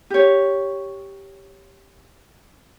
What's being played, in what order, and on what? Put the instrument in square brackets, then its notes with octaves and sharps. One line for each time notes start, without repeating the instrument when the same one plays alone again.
[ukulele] G4 C#5